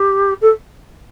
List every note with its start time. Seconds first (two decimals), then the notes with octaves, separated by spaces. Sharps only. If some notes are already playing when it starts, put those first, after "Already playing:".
Already playing: G4
0.41 A4